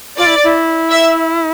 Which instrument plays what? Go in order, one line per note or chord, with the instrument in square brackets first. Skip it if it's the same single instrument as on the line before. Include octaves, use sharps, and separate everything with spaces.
[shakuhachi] F4 [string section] D5
[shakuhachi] E4
E4
[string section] E5